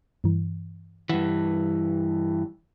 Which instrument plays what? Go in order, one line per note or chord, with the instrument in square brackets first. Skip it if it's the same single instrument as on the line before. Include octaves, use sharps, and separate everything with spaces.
[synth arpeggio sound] G2 E3
[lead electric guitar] G2 E3 [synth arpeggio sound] F#5